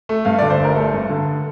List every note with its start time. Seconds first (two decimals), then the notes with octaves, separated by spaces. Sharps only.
0.09 A3
0.25 G2 F5
0.38 D3 D5
0.50 C5
0.60 G1 A#4
0.75 A3 A4
0.93 G2
1.09 D3